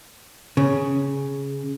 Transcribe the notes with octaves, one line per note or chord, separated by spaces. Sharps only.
C#3